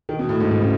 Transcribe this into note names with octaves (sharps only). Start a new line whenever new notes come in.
D#3
B2
A2
G#2
G#2
C#3